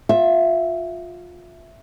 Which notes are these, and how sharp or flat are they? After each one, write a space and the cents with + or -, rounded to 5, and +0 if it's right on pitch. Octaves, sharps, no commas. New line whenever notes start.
F4 +25 E5 +5